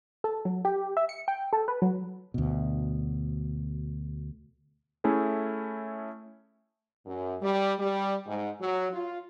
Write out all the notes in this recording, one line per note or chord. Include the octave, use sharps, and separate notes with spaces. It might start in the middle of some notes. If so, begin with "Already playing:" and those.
A4
F#3
G4
E5
C#7
G5
A4
B4
F#3
D2 B2
A3 C#4 E4 G#4 A4
F#2
G3
G3
G#2
F#3
F4